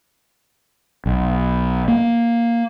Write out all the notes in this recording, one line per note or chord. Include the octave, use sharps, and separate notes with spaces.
B1
A#3